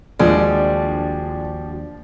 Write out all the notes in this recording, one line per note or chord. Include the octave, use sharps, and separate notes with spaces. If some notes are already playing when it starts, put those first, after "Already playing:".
D#2 F3 G3 G#3 D4 F#4 G4